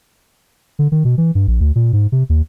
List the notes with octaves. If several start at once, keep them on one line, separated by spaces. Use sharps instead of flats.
D3
D#3
B2
E3
G2
A#1
D2
A#2
G#2
C3
D#2